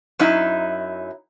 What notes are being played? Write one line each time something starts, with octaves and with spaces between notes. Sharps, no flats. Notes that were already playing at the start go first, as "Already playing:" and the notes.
F#2 F#3 D#4 E4